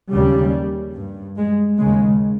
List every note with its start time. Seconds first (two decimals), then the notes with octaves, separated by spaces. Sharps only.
0.11 D#2 C#3 G3
0.94 G2
1.36 G#3
1.78 D#2 C#3 G#3